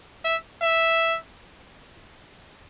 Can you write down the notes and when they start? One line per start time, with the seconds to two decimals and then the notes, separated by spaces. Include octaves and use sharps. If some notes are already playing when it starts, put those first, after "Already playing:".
0.25 E5
0.61 E5